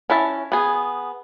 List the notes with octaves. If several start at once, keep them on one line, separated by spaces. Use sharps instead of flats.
C#4 E4 E5 A5
B3 G#4